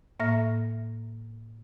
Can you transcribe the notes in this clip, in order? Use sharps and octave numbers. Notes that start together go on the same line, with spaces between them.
A2 A#3 E5 F6 A#6